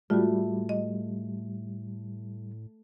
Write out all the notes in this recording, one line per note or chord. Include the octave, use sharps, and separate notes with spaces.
A2 G3 A3 F4 F#4
D#5